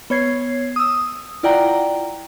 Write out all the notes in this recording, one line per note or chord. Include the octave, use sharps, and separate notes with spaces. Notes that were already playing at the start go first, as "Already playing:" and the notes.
B3 C#5 G#6 C7
D#6 E6
E4 F4 D5 F#5 G5 A#5